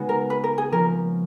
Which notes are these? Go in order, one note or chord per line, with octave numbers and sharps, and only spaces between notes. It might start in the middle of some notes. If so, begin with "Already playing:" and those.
Already playing: C#3 G#3 B3 D#4 F#4
A#4
B4
A#4
G#4
F3 A#3 C#4 A#4